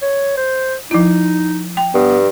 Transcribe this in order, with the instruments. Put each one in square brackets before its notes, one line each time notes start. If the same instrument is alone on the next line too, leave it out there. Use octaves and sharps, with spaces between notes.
[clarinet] C#5
C5
[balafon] F3 E4 [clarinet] D#4
[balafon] G5
[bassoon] G2 [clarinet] B3